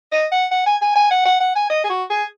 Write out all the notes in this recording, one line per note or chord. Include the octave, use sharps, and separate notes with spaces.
D#5
F#5
F#5
G#5
G#5
G#5
F#5
F#5
F#5
G#5
D#5
G#4
F#4
G#4